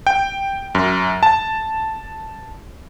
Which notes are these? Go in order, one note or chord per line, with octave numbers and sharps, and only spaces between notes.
G5
F#2
A5